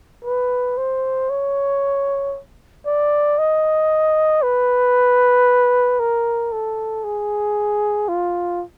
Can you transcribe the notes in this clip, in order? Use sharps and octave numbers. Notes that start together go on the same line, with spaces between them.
B4
C5
C#5
D5
D#5
B4
A#4
A4
G#4
F4